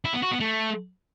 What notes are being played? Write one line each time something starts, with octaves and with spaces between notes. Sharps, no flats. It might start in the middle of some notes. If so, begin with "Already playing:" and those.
E4
B3
F#4
B3
A3